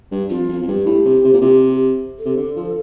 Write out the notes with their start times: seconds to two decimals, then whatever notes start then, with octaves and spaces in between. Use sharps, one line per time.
0.11 G2
0.30 F2 F4
0.49 F2
0.62 F2
0.67 G2 G4
0.86 A2
1.05 C3
1.24 C3
1.33 A#2
1.41 C3
2.19 A4
2.25 C3
2.37 D3
2.56 F3